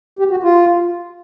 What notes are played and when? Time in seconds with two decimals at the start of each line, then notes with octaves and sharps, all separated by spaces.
0.19 G4
0.31 F#4
0.43 F4